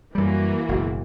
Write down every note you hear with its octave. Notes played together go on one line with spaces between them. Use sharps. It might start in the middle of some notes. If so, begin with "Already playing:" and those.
F#2 E3 G3 A#3 F#4
F#1 G#2 B2